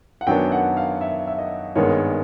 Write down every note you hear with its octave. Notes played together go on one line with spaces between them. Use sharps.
F#5
F#2 D#3 F#3 B3 D4 G5
F#5
F5
E5
E5
D#5
G#1 G2 D#3 G#3 B3 C#5